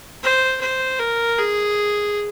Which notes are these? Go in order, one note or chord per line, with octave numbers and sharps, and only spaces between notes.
C5
C5
A#4
G#4